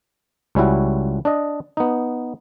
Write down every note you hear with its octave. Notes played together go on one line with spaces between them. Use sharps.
C#2 G3 C#4 E4 F#4
D4 D5 D#5
B3 D#4